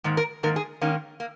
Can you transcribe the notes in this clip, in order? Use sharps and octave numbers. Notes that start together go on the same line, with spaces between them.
G#2 D#3 A#3
A#4
G#2 D#3 A#3 A#4
G#4
G#2 D#3 A#3 C#4
A#3